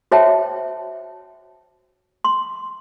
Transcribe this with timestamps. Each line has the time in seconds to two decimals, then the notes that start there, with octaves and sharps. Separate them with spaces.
0.12 F#4 C5 C#5 E5 G5 A5
2.25 C6